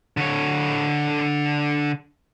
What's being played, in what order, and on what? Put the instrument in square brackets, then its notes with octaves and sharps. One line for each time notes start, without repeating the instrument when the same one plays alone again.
[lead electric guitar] D3 C#5